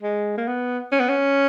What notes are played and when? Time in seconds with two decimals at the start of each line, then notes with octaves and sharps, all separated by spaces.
0.02 G#3
0.37 A#3
0.47 B3
0.92 C#4
1.00 B3
1.09 C#4